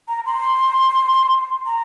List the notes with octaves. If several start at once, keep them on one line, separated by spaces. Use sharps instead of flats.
A#5
C6
A#5